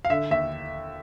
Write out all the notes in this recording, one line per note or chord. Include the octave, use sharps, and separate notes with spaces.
F5
D3 E5
D#2 E5